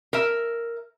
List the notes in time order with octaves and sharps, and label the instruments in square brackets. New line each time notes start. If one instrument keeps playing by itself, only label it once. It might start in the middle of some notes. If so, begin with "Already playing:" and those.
[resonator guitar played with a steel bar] A#4 E5